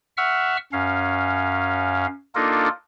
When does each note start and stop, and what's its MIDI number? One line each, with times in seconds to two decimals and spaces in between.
0.17 0.57 76
0.17 0.57 78
0.17 0.57 85
0.17 0.57 88
0.17 0.57 89
0.73 2.07 42
0.73 2.07 61
0.73 2.07 77
2.35 2.69 58
2.35 2.69 62
2.35 2.69 63
2.35 2.69 65
2.35 2.69 69
2.35 2.69 70